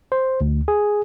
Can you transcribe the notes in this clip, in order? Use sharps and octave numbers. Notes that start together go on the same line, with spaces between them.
C5
D2
G#4